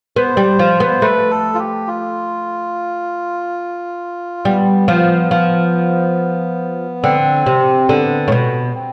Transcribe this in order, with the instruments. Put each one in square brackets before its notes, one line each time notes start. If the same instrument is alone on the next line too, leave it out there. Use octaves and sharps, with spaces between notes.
[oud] B3 [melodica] C5
[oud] G3
F3
B3
[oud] A3 [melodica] B4
[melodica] A4
F4
G4
F4
[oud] G3 [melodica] B3
[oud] F3
F3
[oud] D3 [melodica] C4
[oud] C3
[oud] D3 [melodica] B3
[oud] A2
B2
[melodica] C4